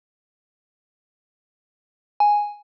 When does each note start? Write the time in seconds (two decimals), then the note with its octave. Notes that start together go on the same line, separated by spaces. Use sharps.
2.20 G#5